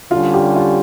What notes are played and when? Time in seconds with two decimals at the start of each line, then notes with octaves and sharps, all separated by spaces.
0.11 D3 G3 C#4 F4
0.34 G4
0.56 F4